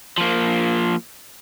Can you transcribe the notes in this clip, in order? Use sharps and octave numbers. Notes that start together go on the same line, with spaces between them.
F3 A#3